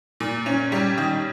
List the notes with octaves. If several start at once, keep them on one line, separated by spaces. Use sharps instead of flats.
A#2
C#4
G3
D#3